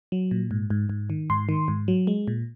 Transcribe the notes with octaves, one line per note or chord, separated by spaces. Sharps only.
F#3
A#2
G#2
G#2
G#2
D#3
G#2 C6
D#3
G#2
F#3
G#3
A#2